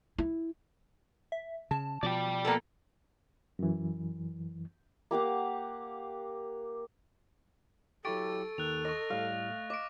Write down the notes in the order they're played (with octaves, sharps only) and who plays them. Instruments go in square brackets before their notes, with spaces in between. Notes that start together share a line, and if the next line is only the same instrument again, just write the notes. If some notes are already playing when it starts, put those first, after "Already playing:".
[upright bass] E4
[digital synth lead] E5
[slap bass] C#3 [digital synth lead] A5
[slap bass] B2 F3 [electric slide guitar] D5 G5
[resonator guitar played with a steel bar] A#3 B3 A4
[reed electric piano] F#2 E3
[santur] A#3 G4 F5 F#5
[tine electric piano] F#3 E4 G4 [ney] A4 [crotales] C#6 A6 D7
[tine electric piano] D#2 D#3 [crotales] F#6 F7
[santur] D#5 [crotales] C#6 A#6
[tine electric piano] A2 G3 [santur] F5
[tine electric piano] A3
[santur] D#5 [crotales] D6 D7